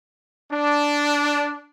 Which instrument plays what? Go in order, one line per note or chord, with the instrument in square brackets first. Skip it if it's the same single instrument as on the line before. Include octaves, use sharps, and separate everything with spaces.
[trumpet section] D4